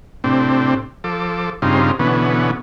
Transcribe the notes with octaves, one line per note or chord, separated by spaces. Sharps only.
A2 C3 C4 D4
F3 A4 D6
G2 C#3 C4 D#4 F4
B2 D3 E3 B3 C#4